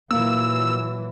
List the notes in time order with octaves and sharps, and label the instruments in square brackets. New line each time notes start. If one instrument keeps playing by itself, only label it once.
[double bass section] A#2 E3 F#3 [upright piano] A#3 [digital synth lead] E6